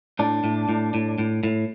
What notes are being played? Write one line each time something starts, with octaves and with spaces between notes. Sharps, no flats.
A2 D4
A2
A2
A2
A2
A2